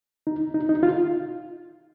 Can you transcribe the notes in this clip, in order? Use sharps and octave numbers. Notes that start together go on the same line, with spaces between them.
D#4
D#4
D#4
F4